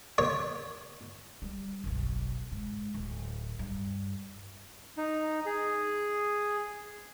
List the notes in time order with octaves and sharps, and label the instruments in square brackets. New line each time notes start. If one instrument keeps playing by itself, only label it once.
[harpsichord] C#5
[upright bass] G3
F#1 B1
G#2
D1
G2
[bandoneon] D#4
G#4